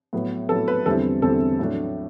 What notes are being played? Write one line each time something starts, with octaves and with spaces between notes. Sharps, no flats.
A2 F#3 B3
A2 F#3 B3 A4
B4
E2 D3 G3 C4 E4 A4
E2 D3 G3 C4 E4 A4
A2 F#3 A3 D4